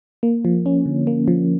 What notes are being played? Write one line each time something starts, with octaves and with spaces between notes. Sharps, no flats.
A#3
F3
C#4
D3
A#3
F3